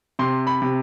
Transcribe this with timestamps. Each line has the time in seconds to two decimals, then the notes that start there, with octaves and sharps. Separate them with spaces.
0.19 C3 C6
0.47 B5
0.62 C3